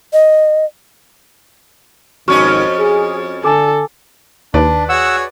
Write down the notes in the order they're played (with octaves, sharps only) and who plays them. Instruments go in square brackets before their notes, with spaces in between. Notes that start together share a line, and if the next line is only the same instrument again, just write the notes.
[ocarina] D#5
[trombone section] G#1 D#3 [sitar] F2 C#4 D#5 [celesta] F#4 C#6 F6
[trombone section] G#4
[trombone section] D3 [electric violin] A4 [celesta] G#5 D6
[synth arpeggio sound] D#2 [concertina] D4 [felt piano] B4 D5
[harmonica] F#4 G#4 C#5 [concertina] F#5 E6